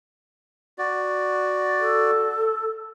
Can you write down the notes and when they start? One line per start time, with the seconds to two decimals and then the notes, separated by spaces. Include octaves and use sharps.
0.78 F#4 D5
1.79 A4